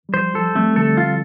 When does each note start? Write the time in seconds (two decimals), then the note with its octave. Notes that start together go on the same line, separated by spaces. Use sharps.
0.09 G3
0.14 F3 C5
0.34 F3 A4
0.55 G3 A3 C4
0.76 D3 G3 A4
0.97 F4